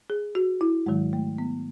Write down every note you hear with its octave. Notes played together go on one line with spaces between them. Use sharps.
G#4
F#4
E4
G#2 D#3 F#3 G#3
A3
B3